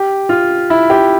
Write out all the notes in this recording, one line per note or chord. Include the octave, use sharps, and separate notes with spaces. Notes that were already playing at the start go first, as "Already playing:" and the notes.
Already playing: G4
F4
E4
G4